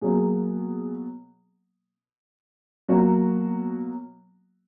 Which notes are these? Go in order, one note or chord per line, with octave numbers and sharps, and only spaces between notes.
B2 F#3 A#3 G#4
B2 F#3 A#3 F#4